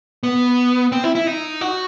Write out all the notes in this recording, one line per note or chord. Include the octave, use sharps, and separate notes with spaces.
B3
C4
E4
E4
D#4
F#4